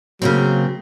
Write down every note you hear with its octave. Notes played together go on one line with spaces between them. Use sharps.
C#3 F#3 A#3 C4